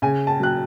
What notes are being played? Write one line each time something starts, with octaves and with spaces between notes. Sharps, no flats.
C#3 G#5
A5
F#3 F#6